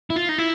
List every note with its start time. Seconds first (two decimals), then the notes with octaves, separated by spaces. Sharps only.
0.10 E4
0.16 F4
0.29 D#4
0.38 E4